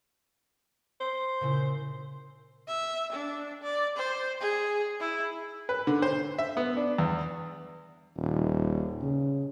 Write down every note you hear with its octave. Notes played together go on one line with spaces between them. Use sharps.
C5
A#2 C#3 E4
E5
D4
D5
C5
G#4
E4
B4
D3
C5
E5
B3
D4
E2
D#1
C#3